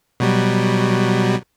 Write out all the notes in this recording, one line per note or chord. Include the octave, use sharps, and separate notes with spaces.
B2 F#3 G3